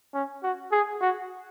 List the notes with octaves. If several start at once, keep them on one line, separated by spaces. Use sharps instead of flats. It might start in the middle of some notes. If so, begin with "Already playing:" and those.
C#4
F#4
G#4
F#4